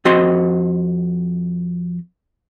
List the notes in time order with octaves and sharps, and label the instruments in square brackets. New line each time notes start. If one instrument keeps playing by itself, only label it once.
[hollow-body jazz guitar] F2 C4 F#4 D#5 C6